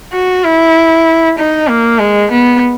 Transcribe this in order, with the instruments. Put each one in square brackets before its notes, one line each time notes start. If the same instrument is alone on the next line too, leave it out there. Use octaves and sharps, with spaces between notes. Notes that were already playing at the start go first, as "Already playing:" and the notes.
[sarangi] F#4
E4
D#4
A#3
G#3
B3